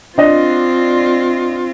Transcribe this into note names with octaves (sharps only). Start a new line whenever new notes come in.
C4 D4 F4 D#5